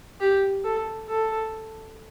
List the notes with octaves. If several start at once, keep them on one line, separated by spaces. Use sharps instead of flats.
G4
A4
A4